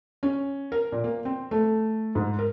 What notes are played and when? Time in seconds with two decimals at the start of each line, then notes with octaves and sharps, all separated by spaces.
0.23 C#4
0.72 A#4
0.92 A#2
1.04 A#3
1.25 C4
1.51 A3
2.15 G#2
2.39 A#4